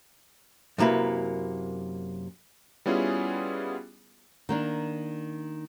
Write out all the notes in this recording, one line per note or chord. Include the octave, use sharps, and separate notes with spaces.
F#2 C3 A#3 E4 B4
G3 B3 C#4 E4 F4 G#4
D#3 A#3 D4